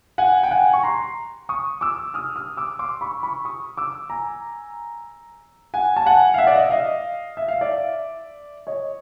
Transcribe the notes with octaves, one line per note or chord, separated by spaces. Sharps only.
F#5 G#5
G5
F#5 G#5
C#6
A#5 C6
C#6 D#6
D6 E6
D#6 F6
D#6 F6
D6 E6
C6 D6
B5 C#6
B5 C#6
C#6 D#6
D6 E6
G#5 A#5
F#5 G#5
A5
F#5 G#5
F5
E5 F#5
D5
D#5
E5
D#5 F5
E5
F5
D5 E5
C#5 D#5